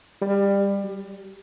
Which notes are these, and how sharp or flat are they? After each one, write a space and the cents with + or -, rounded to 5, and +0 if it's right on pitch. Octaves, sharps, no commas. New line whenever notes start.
G3 +25
G3 -40